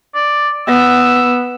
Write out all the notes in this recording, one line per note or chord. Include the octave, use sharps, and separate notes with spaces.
D5
B3 E6